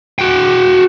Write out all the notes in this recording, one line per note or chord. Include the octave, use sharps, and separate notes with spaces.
F#4 G5